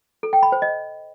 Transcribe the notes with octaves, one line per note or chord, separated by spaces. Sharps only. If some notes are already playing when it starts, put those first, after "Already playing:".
A4
G5
B5
C5
D#5